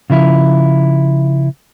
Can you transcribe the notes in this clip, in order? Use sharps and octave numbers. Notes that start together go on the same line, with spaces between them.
C#3 F3 E4